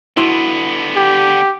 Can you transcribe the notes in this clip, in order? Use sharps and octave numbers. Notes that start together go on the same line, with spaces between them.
D3 B3 E4 F#4 C6
G4